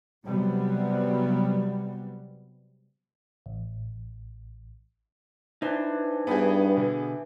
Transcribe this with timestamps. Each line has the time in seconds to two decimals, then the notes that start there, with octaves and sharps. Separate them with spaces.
0.25 C3 F#3 G3 B3
3.46 A1
5.62 E3 D4 D#4 C5
6.27 G2 E3 B3 G#4 G5
6.77 B2 D3